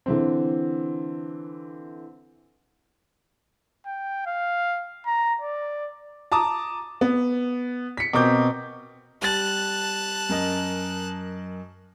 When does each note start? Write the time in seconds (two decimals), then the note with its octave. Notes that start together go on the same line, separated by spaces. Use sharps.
0.06 D3 E3 C4
3.87 G5
4.26 F5
5.06 A#5
5.41 D5
6.32 A5 A#5 D6 D#6
7.01 B3
7.97 B6 C#7
8.13 B2 C4 A#4 D6 G6
9.22 G3 A5 F#6 A6
10.29 F#2 A#4 D#5